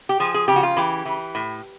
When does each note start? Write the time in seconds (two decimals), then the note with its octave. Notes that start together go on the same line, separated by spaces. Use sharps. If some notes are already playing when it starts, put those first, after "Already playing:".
0.09 G4
0.20 F3 G#4
0.34 G#4
0.48 C#3 G4
0.56 F#4
0.63 F4
0.77 E3 G4
1.06 E3
1.35 A2